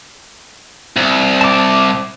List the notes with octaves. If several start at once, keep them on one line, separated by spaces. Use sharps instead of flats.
C2
A5 D6